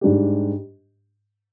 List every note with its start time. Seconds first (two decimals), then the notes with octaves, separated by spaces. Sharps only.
0.01 G#2 G3 D4 G4